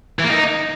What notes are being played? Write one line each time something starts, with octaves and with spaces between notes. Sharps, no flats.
E3
A#3
D#4